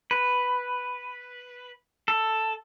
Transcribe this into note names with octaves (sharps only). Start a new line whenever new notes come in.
B4
A4